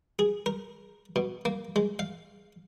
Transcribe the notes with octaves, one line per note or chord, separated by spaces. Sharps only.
G#4
A#4
B2
A#3
G#3
F5